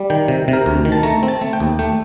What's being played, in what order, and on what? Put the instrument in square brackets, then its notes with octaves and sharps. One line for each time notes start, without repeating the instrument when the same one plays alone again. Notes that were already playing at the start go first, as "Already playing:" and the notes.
Already playing: [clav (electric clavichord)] G3
D#3 G5
C3
C3
A#4
D2
D#3
A5
A3 A#5
C4
A5
A3
G5
D#2
A3 G5